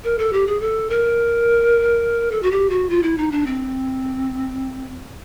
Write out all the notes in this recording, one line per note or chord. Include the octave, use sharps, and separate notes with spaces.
A#4
A4
G4
G#4
A4
A#4
A4
F#4
G4
F#4
F4
E4
D#4
D4
C4